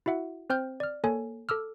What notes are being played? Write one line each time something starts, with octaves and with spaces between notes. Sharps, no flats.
E4 F#4 E5 F#5
C4 C5 G5 F6 G6
D5 F6
A#3 A4 C#5 G#5
A4 D6 E6 F6